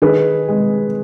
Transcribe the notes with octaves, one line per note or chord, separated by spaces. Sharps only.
D#3 G#4 B4
G#3